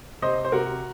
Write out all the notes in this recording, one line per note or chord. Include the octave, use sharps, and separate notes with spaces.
C3 C5 D#5
C5
C3 F#4 A#4